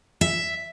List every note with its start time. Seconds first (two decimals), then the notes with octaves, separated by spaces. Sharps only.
0.21 E5